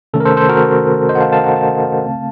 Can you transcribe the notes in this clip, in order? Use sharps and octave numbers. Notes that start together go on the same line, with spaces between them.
C3 D#3 A3 C#4 A4
A#4
A4 C5
A4 C5
F#4 A#4
C5 D#5
F#5
F5 A5
F5 A5
F#5 A#5
F5 A5
C#3 A3 C4